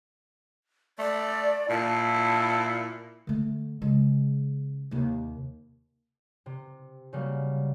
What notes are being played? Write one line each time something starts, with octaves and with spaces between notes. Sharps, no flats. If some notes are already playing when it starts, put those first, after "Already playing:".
A3 D5
A#2 E4 A5
D3 A3
C#3 G#3
D#2 C3
C3
C#3 F#3 G3 A#3